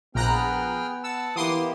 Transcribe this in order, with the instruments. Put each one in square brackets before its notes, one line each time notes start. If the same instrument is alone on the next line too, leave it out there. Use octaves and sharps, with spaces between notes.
[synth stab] A#1 A#5 F#6 [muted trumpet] B3 [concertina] G#4 G5 F6
[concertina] F#5 A5 [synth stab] E6
[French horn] E3 [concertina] A#3 B3 G4 [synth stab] C6 D6 D#6